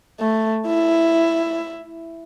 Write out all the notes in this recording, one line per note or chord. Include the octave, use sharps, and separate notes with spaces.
A3
E4